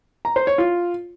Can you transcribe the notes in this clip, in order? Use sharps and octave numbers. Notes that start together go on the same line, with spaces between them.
A#5
C5
C#5
F4